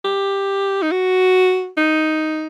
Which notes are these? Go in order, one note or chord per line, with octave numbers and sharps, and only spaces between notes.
G4
D#4
F#4
D#4